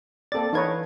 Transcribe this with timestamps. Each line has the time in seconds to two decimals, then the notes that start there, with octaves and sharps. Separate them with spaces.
0.32 A#3 C4 A4 D5 A6
0.53 E3 D#4 B4 C#5 F5 G#6